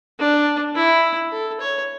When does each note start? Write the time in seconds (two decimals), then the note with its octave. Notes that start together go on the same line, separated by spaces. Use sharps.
0.20 D4
0.76 E4
1.32 A4
1.61 C#5